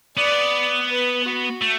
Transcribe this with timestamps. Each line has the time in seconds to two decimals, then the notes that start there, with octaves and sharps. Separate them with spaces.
0.17 B3 D5
0.89 B4
1.25 F#4
1.61 A3